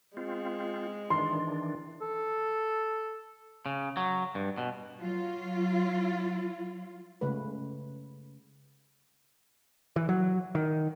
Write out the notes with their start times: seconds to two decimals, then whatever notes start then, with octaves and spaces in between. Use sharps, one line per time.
0.17 G#3 C4 F4
1.10 D#3 E3 D4 C6
2.01 A4
3.66 C#3
3.97 F#3
4.35 G2
4.58 B2
4.98 F#3 F4
7.21 C#3 G#3 A3 B4
9.96 E3
10.09 F#3
10.55 D#3